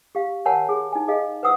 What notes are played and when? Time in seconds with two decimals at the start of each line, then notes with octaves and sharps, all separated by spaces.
0.15 G4 F5
0.45 A#4 C#5 F#5 G#5 A5 B5
0.69 G#4
0.93 D#4 G#5
1.08 G#4 D#5 F5
1.43 B4 C5 F#5 D#6 E6